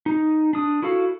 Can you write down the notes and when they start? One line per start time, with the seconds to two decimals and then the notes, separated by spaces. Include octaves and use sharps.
0.06 D#4
0.53 D4 D#6
0.82 E4 F#4 A4 F5